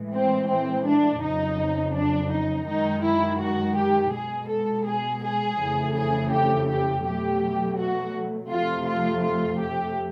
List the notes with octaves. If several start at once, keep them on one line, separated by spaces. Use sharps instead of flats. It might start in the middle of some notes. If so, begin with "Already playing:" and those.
Already playing: A2 E3 G#3
C4
C4
D4
F2 C#3 F#3 D#4
D4
D#4
F#2 D#3 G#3 D#4
E4
F#4
G4
B2 G#3 G#4
A4
G#4
G#4
F2 C#3 E3 A3
G#4
G4
G4
B2 F#3 A3 G4
F#4
F2 C3 F3 A3 F4
F4
F4
G4